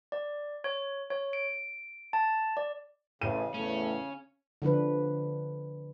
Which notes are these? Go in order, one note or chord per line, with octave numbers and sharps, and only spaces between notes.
D5
C#5
C#5
D7
A5
D5
A1 C#3 D#7
E2 A2 A3 C#4
D3 F3 D4 B4